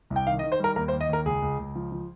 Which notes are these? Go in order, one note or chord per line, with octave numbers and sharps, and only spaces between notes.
C2
G5
D#3 F5
D#5
D#3
C5
G3 A#4
D#2 A#4
C5
D#2
D#5
D#2 A#4
C#2 G#4
C#2
C#2
F3
F3